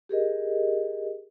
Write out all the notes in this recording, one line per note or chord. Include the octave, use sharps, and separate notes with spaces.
G4 G#4 A#4 D#5